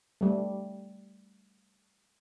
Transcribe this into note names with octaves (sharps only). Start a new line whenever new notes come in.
G3 A3